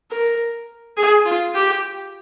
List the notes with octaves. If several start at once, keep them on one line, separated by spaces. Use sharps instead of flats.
A#4
G#4
F4
G4